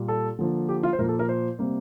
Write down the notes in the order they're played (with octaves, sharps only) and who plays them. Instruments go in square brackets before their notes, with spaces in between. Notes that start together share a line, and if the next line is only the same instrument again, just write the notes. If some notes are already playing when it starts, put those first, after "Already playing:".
Already playing: [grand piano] A#2 G3 A#3
A4
D3 F3 A#3
G4
F4
C5
A#2 F3 A#3 A#4
A4
A#4
C5
C3 G3 A#3